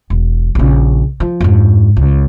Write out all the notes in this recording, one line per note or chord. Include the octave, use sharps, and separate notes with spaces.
E1
A#1 C#3
F3
F2 G#2
C#2